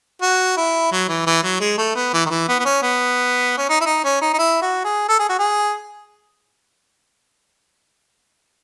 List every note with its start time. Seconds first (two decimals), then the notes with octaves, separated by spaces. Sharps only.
0.22 F#4
0.57 E4
0.92 F#3
1.08 E3
1.26 E3
1.43 F#3
1.60 G#3
1.78 A3
1.95 B3
2.14 E3
2.26 D#3
2.30 E3
2.48 B3
2.59 B3
2.65 C#4
2.82 B3
3.57 C#4
3.69 D#4
3.81 E4
3.86 D#4
4.04 C#4
4.21 D#4
4.34 D#4
4.39 E4
4.62 F#4
4.84 G#4
5.08 A4
5.19 G#4
5.29 F#4
5.39 G#4